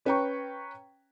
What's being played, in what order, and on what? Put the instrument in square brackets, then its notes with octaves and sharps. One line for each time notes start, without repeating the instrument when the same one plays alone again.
[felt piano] C#4 B4 C#5 G5 A#5 C#6